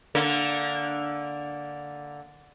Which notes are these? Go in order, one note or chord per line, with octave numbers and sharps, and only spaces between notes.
D3 A#3